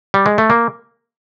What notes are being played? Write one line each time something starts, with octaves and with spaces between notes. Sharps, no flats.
G3
G#3
A3
A#3